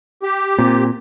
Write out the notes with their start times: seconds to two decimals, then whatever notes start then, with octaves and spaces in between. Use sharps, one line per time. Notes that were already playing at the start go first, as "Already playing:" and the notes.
0.23 G4
0.58 A#2 C4